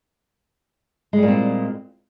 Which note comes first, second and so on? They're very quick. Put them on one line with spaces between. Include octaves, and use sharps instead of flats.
G#3 G3 A#2 C4